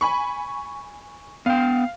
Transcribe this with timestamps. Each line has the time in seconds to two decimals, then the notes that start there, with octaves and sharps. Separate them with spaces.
0.01 G#5 B5 C#6
1.46 B3 F5 G5